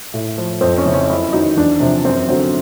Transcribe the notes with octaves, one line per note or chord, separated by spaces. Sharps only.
A2
F3
F2 C4
C#4
C#3 E3
C#4
F#2 E4
D#3 F#3 D#4
E2 D4
C3 F3
F#2 C4
D3 F#3 C4